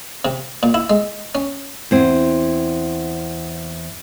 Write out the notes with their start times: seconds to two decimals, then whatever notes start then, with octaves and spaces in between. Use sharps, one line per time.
0.25 C3
0.63 A#2
0.74 E4
0.90 G#3
1.35 C#4
1.91 E2 C4